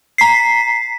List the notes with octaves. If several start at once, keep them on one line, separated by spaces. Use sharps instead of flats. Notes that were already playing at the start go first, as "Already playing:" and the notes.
A#5 B6 C7